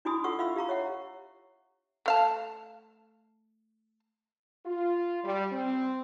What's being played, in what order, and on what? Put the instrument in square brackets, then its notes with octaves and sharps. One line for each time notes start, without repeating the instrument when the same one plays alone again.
[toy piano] D4 E4 F#4 G#5 B5 D#6
F4 A4 F#5 C6 C#6 E6
E5 F5 B5 E6
G4 F5 A#5 C#6
C#5 E5 F#5
[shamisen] A3 F5 A5
[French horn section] F4
G3
C4